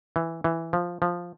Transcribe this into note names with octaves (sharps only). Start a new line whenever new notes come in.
E3
E3
F3
F3